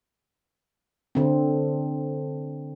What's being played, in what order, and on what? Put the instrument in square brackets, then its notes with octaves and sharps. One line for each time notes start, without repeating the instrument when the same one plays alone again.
[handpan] D3 C4